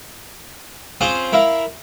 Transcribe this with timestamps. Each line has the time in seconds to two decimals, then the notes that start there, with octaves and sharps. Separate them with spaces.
1.01 C4 C#4 F4 G#4 C5
1.33 E4 A#4 E5 F5